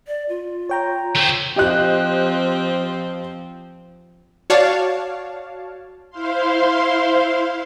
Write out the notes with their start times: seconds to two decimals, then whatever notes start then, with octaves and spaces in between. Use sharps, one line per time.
0.07 D5
0.29 F4
0.69 C#5 G5 A#5
1.16 A3 C5
1.56 F3 C4 G4 D#5 F#6
4.50 F#4 C#5 D5 F5 A5
6.10 E4 C5 F5 C6